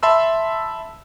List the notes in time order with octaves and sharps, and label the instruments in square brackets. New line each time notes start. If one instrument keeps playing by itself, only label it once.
[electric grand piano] E5 A5 B5 C6 E6